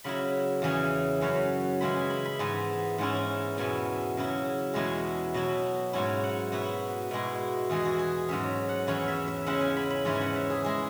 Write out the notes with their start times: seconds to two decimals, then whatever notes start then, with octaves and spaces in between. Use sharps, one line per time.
0.04 C#3 F#3 E4 B5
0.62 E2 C#3 E3 C#4 E4 G#5
1.21 F#2 F#3 C#4
1.80 C#3 E3 G#3 E4 B5
1.96 G#5
2.10 B5
2.25 B5
2.39 G#2 E3 B3 G#5
2.98 G#2 E3 C#4 E4
3.57 E2 B2 B3 E4 G#5
4.17 C#3 F#3 E4
4.74 E2 B2 G#3 B3 E4 G#5
5.34 B2 F#3 E4
5.93 G#2 F#3 C#4 E4 G#5
6.23 F#5
6.52 B2 B3 E4 F#4
7.11 B2 G#3 E4
7.69 E2 E3 G#3 G#4
7.85 F#4
7.99 G#4
8.29 G#2 F#3 C#4 E5
8.69 F#5
8.87 E2 E3 C#4 E4 C#5
9.08 E5
9.28 E5
9.46 C#3 G#3 C#4 E4 F#5
9.61 G#5
9.76 B5
9.90 B5
10.05 G#2 E3 C#4 E4 G#5
10.21 F#5
10.36 E5
10.50 G#4
10.64 G#3 E4 G#4